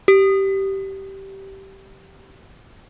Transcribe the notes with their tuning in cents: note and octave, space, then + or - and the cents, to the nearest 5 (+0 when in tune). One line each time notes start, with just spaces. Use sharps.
G4 -15